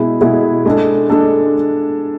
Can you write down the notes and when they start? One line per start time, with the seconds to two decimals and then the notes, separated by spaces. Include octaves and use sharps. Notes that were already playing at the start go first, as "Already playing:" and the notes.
Already playing: B2 G#3 B3 E4 G#4
0.21 B2 G#3 B3 E4 G#4
0.65 G#3 D4 A4
1.10 G#3 D4 A4